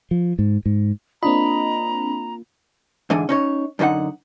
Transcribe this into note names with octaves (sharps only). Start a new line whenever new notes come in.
F3
G#2
G#2
A#3 C4 D4 F4 D#5 A#5 B5
G#2 D3 E3 D4 G#5
C#4 D#4 C#5
F#2 D3 E3 D#4 F#5